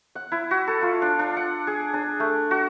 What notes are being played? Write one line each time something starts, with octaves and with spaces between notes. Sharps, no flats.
F#5
E4
F#4
A4
F4
D4
D4
F#5
G#4
D4
A3
F#4